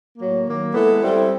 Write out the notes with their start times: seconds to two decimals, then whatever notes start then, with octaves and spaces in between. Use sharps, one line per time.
0.17 A2 F#3 A#3
0.45 D#3 F#3 A#3
0.74 G#3 B3 E4 A4
1.01 G3 C4 E4 A4